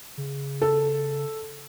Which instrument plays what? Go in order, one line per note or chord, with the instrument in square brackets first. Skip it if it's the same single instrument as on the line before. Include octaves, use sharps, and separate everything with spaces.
[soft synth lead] C#3
[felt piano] A4